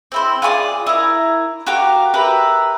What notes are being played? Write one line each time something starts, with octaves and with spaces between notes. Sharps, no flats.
C4 E4 C5
F4 G#4 C#5 D5
E4 A#4
F#4 G4 A#4 F5
G4 A#4 B4 E5